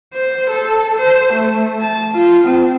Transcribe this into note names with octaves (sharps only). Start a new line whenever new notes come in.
C5
A4
C5
A3
A5
F4
C4